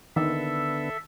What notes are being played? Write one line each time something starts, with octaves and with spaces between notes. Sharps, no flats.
D3 D#3 B3 A4 E5